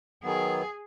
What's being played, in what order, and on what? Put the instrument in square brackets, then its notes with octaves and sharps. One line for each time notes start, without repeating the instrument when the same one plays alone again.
[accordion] D#3 F#3 B3 [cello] G#4